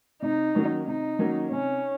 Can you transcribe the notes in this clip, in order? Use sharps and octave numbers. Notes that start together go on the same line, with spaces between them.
C3 D#4
D#3 F#3 A#3 C#4
C3 D#4
D#3 F#3 A#3 C#4
C3 C#4